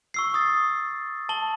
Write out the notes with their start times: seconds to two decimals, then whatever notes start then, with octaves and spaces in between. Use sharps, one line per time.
0.14 C#6 E6 C7
0.34 D#6 A6
1.29 A5 F#7 G7